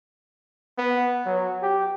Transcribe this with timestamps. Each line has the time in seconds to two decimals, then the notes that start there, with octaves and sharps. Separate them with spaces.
0.78 B3
1.26 F#3
1.62 G4